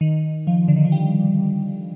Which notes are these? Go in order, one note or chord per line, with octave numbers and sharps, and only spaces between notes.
D#3
F3
D3
D#3
F3
G3